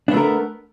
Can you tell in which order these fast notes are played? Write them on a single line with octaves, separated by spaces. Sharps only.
D4 B3 A3 A#4